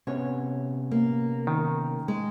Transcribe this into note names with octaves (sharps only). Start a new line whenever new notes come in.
C3 B3 C#4 C#5
A#3
D#3
G#3